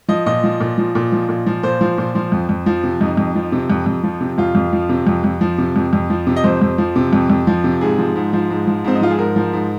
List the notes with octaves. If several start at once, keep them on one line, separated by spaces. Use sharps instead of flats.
F3 D#5
A#2 D#5
F3
A#2
F3
A#2
F3
A#2
F3
A#2 C5
F3
A#2
F3
F2
F2
F3
C3
F2 D#4
F2
F3
C3
F2
F2
F3
C3
F2 F4
F2
F3
C3
F2
F2
F3
C3
F2
F2
F3
C3
D#5
F2 C5
F2
F3
C3
F2
F2
F3
C3
G#2 G#4
F3
G#2
F3
G#2
F3
G#2 C4
D#4
F3 F4
G#4
G#2 A#4
F3
G#2